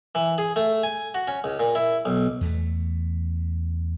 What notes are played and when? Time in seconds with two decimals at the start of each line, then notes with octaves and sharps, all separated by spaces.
0.15 E3
0.38 G#4
0.56 A3
0.83 G#5
1.15 F#4
1.28 C#4
1.44 C#2
1.59 A#2
1.75 E4
2.05 B1
2.41 E2 A3